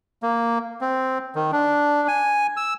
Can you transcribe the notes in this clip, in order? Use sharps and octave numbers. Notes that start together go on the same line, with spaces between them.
A#3
C4
D#3
D4
G#5
E6